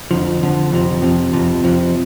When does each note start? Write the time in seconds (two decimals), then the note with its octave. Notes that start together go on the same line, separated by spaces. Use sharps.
0.11 F2 D3 F3
0.41 F2 D3 F3
0.72 F2 C3 F3
1.02 F2 C3 F3
1.33 F2 C3 F3
1.64 F2 C3 F3